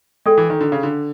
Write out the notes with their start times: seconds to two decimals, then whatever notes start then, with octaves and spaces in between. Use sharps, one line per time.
0.26 G#3 A4 D5 G5
0.38 E3
0.50 D#3
0.61 D3
0.72 C#3
0.83 D3